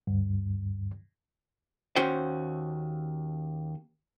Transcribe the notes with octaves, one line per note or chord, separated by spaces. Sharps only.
D2 G2
D#2 C#4 F#4 C5 G5